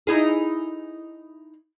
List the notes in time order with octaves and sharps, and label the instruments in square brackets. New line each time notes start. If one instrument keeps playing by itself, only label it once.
[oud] D#4 E4 G#4